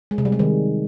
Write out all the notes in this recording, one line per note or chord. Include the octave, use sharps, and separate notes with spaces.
G#3
C3
G3
G#3
D#3